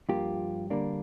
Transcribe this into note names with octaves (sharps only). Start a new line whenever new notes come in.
G2 F3 A#3 F4 G4
D3 G3 A#3 D4